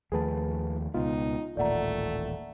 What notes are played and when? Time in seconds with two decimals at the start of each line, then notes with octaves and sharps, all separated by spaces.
0.12 D#2 F3 A3 G#4 B4 A5
0.94 C#2 B2 B3 D#4 F4
1.57 D#1 A1 A#2 A3 D5 F#5 A#5